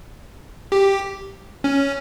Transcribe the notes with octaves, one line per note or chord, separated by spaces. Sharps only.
G4
C#4